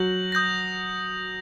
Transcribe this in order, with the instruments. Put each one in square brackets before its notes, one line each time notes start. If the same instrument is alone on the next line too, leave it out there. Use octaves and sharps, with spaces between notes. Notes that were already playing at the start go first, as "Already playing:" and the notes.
Already playing: [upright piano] F#3 F#4 [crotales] G6 A#6 F#7
[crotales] D#6 G6 A#6